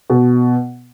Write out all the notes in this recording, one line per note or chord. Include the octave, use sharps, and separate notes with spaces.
B2